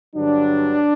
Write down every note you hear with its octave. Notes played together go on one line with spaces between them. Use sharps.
G2 D3 F#3 D4